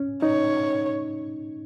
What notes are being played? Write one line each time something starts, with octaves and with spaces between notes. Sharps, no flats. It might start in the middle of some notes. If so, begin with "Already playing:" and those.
Already playing: C#4
D#4 C#5